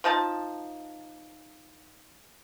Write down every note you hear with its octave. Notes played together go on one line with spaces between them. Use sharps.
F3 D#4 A5